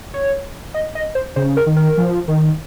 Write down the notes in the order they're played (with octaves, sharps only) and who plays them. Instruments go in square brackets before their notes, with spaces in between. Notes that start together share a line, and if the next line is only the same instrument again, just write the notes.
[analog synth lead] C#5
D#5
D#5
C5
[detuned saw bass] C#3 [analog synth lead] C5
[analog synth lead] A#4
[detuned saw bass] D#3
[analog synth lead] A#4
[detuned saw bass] F3
D#3